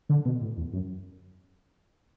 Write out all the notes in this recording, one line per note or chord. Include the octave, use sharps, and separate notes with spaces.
D3
B2
A2
E2
F#2